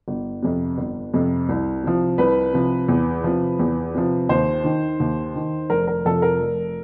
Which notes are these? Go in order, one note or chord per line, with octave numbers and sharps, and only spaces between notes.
G1
F2 C3
G1
F2 C3
C2
C3 F3
C2 B4
C3 F3
E2
C3 F3
E2
C3 F3
D#2 C5
D#3
D#2
D#3
F1 A#4
A#4
F2 C3 F3 A4
A#4
F1